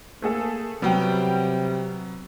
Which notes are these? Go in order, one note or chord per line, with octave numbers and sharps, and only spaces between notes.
A3 A#3 G#4 A4
C3 F#3 G3 B3 G5